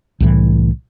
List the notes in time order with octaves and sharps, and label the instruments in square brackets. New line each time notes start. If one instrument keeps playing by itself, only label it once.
[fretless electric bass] C2 A2 E3